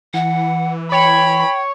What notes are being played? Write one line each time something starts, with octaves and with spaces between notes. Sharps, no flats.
E3 F#5
C#5 G5 B5